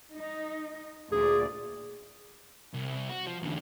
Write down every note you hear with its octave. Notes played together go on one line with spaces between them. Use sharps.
D#4
D2 A#2 G#4 D5
C2
F#4
F3
E2 D3